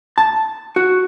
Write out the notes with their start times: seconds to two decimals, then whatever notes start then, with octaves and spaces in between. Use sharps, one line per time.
0.18 A5
0.76 F#4